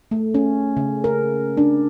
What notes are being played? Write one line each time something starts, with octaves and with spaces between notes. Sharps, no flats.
A3
C#4
C#3
A#4
D4